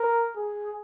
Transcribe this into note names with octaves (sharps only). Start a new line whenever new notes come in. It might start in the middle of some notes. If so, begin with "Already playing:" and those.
Already playing: A#4
G#4